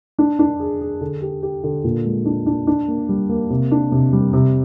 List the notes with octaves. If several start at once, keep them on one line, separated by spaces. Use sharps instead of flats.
D4
D4
G#4
G#4
D3
G4
G4
D3
A#2
G#3
D4
D4
D4
A#3
G3
A#3
C3
D4
C3
G3
C3